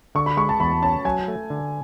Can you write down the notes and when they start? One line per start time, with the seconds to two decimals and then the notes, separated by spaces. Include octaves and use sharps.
0.15 D3 C#6
0.26 B5
0.37 G#3 C#6
0.49 A5
0.60 E2 B5
0.82 C#4 A5
1.05 F#3 G#5
1.28 A3
1.50 D3